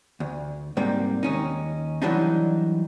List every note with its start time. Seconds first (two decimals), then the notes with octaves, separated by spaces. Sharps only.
0.20 D2
0.77 G#2 C3 G3 A#3
1.23 D#2 C#4 D#4
2.02 E3 F#3 G3 D4 D#4